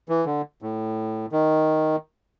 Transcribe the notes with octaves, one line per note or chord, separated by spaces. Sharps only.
E3
D3
A2
D#3